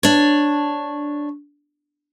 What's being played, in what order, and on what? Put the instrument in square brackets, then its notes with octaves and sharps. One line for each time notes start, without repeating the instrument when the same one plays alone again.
[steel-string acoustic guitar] D4 C#5